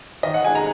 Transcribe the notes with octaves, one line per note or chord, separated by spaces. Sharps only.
D#3 D#5
F#5
G#3 D#4 G#5
A#5